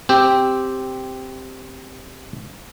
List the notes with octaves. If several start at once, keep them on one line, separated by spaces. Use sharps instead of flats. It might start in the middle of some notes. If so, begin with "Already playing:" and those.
C4 G4